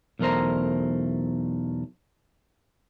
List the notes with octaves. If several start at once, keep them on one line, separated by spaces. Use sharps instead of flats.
B1 E2 A3 A#4 C5 A#5